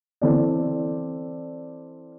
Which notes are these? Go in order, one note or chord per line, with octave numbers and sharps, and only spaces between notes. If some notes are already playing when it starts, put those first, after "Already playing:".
E3 C4 A4 D5